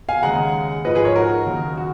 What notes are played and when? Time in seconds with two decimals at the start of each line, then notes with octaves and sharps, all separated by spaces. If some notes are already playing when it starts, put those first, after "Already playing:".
0.09 F5 G#5
0.23 D#2 C#3 G#3 F#5 A#5
0.85 G#2 F3 G#3 B4 D#5
0.95 G#4 B4
1.05 A#4 C#5
1.16 F#4 A#4
1.46 D#2 C#3 F#3
1.77 F#4